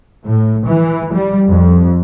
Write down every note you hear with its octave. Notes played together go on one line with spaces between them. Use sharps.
A2
E3
G3
F2